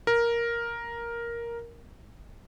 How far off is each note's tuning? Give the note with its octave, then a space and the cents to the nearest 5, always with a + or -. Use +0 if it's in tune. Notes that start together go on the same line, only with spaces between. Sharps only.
A#4 +5